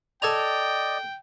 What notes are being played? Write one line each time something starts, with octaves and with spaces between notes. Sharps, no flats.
A4 D5 D#5 G5 G#5 A#5